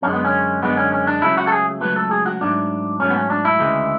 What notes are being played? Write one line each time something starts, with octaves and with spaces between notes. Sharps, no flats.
F#2 D3 G#3 C#4
B3
C#4
F#2 D3 G#3 B3
C#4
C#4
D4
C#2 C#3 F#3 A3 E4
F#4
A4
G#4
C#2 C#3 F#3 A3 B4
A4
G#4
F#4
G#2 F#3 A3 D4
G#2 F#3 A3 C#4
B3
C#4
D4
E4
D2 C#3 E3 G#3